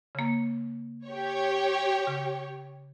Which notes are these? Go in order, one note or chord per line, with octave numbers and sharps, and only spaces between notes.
C#3 A#3
G4 C#5
C#3